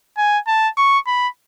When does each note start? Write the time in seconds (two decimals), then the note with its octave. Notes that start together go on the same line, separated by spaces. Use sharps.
0.18 G#5
0.47 A5
0.77 C#6
1.07 B5